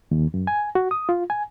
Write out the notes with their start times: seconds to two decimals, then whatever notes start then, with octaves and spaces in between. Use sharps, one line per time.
0.11 D#2
0.34 F#2
0.47 G#5
0.75 F#4
0.91 D#6
1.09 F4
1.30 G#5